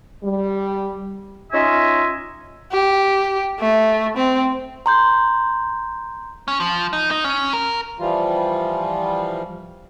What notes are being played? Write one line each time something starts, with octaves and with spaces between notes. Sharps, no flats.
G3
C#4 D#4 F4 D#5 E5 G#5
G4
A3
C4
A#5 C6 G6
C#4
F3
D#4
D#4
C#4
A#4
E3 F3 G3 F4